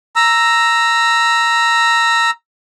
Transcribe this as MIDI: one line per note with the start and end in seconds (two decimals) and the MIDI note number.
0.16 2.30 82
0.16 2.30 88